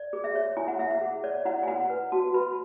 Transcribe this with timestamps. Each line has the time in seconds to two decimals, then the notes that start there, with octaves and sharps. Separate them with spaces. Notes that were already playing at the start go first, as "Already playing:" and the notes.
Already playing: D5
0.13 G#4
0.24 E5
0.35 C#5
0.57 E4 G#5
0.68 F#5
0.79 E4 E5
0.90 F#5
1.01 G#4
1.24 C#5 D5
1.45 E4 F#5
1.63 G#5
1.67 E4 F#5
1.90 B4
2.12 F#4 A5
2.34 B4 B5